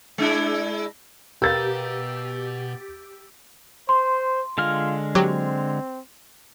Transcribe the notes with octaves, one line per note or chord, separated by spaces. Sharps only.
G#3 D4 E4
B2 B3 G4 A#4 B4 F5 E6 A6
C5 C6
D3 G#3 F4 F6
F#3 C4 G4